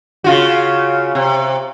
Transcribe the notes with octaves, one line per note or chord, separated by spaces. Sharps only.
C#3 F4 F#4
C3